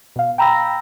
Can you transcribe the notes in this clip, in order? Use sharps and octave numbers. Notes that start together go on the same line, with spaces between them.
B2 F5
G5 A#5 B5 E6 A#6